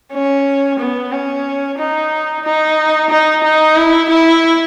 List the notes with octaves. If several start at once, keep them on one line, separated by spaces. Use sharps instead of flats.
C#4
B3
C#4
D#4
D#4
D#4
D#4
E4
E4